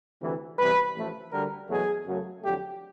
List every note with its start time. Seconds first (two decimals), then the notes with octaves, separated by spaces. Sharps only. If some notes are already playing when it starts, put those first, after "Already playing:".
0.21 D2 C3 E3
0.58 E2 C3 E3 G3 B4
0.95 A1 A2 F3 A3
1.32 D2 D3 G3 A#4
1.68 E2 B2 F#3 A3 G#4
2.05 F#2 C#3 F#3 A3
2.43 F2 D3 F#3 A3 G4